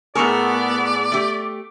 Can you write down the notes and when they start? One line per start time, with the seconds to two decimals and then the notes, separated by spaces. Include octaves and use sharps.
0.15 A2 B3 G#4 A#4 D5 C#6 E6
1.12 A3 G4 D6